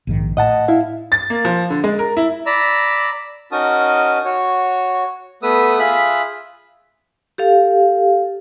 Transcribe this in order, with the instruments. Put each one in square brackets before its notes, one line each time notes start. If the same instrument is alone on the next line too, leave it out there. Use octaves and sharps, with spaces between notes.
[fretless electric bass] A#1 G#2 D#3
[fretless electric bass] A2 [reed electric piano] D#5 F#5 A5
[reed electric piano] E4 E5 F5
[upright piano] A6
A#3
F3
D3
G#3
A#4
E4
[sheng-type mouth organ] D5 A#5 B5 E6
C#4 D#4 F#4 A#4 A5 D#6
F#4 C#5
A3 B3 B4 D#6 E6
F4 G#4 E5 B5 F#6
[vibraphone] G4 A4 F5